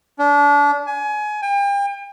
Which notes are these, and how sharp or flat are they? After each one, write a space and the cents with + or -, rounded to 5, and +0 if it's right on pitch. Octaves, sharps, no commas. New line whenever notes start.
D4 -30
G#5 +25
G5 +40